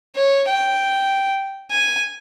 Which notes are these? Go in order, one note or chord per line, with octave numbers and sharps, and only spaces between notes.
C#5
G5
G#5